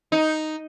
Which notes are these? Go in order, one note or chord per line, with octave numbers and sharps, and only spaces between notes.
D#4